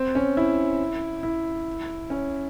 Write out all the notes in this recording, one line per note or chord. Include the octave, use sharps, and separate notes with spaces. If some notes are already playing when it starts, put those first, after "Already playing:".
Already playing: C4
C#4
E4
E4
C#4